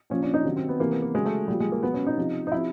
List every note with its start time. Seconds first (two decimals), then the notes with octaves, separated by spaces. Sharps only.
0.10 A#2 F3 C#4
0.23 D4
0.34 D#4
0.44 C3 D#3 F#3
0.56 C4
0.69 B3
0.80 C3 E3 A#3
0.91 B3
1.02 A#3
1.14 C#3 F#3 G#3
1.25 A3
1.48 A#2 F3 G3
1.60 G#3
1.72 A#3
1.83 B2 F#3 B3
1.94 C#4
2.07 D#4
2.17 C3 F3
2.47 D#4
2.52 C3 F3 E4